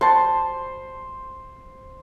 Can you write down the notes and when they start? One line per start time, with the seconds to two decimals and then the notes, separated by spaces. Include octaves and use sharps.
0.01 G3 F#4 C5 A5